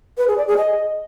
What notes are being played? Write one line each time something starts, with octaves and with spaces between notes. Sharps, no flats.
B4
G#4
D5
G#4
D#5